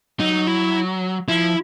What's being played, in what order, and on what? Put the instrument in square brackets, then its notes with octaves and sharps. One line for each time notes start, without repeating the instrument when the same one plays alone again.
[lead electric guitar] F#3 [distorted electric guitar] D#4
[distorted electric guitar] E4
[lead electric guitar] F3 [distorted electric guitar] E4